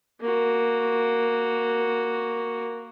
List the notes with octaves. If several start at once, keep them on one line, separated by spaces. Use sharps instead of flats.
A#3 F#4